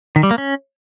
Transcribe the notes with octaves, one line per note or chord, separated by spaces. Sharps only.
D#3
G3
A#3
C#4